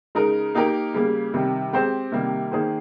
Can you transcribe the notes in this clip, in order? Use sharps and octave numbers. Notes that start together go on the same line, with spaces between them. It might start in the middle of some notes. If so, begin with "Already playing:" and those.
C#3 G#3 D#4 A#4
A#3 D#4 G4 A#4
C#3 G3 A#3
C3 D#3 G3
G#3 C4 G4 C5
C3 D#3 G3 A#3
D#3 A#3 D#4 G#4 C5